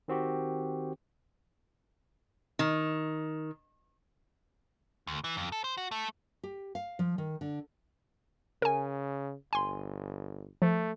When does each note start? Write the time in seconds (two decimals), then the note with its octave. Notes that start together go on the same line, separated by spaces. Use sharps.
0.08 D#3 C4 F#4 G4
2.59 D#3
5.07 D2
5.24 E3
5.37 F2
5.52 A4
5.64 C5
5.77 F#4
5.91 A3
6.43 G4
6.75 F5
6.99 F3
7.18 D#3
7.41 D3
8.62 C#3 A#4 G#5
9.53 G1 G#5 C6
10.62 F3 A3